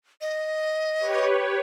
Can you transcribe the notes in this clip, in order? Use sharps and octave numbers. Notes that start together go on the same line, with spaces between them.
D#5
G4 B4 C#5